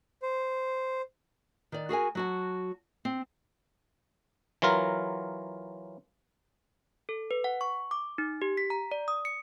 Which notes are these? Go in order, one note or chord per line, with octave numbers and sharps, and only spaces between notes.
C5
D#3 D5
F#4 G#4 A#4 G#5
F#3 F#4 A5
C4
E3 F#3 F4 A#4
A4
B4
F#5
C#6
D6
D#4
G4
B6
A#5
D5
D#6
C#7